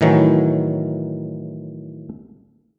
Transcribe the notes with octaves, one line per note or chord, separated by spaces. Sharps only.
A2 D#3 E3 F#3